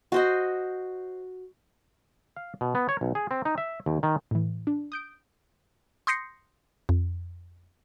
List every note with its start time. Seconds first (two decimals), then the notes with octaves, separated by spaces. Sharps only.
0.12 F#4 C5 D#5
2.36 F5
2.61 B2
2.75 B3
2.89 C#5
3.01 B1
3.15 G#4
3.31 C4
3.45 D#4
3.58 E5
3.86 D#2
4.03 D#3
4.31 A2 E3
4.67 D4
4.92 D#6 G6 D7
6.07 C6 D#6 G6 A#6 C7 C#7
6.89 F2